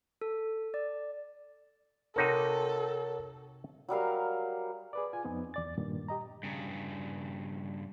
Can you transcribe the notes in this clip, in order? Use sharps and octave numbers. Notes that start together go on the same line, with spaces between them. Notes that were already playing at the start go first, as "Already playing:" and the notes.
A4
D5
C3 D#4 F#4 A4 A#4 C#5 F#5
F#3 G3 A#4 F5
G#4 B4 D5
F4 G#5
F2 B3 C4 D#4
E2 D5 A6
G2 A#2 D#3
G4 D#5 A#5
G2 C#3